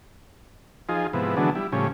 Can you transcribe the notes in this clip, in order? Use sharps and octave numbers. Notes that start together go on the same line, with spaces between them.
F3 D#4 F4 G#4
G#2 C3 F3 B3 E4
D3 E3 F#3 G#3 B3 D4
G3 E4
A2 C#3 F3 G3 C#4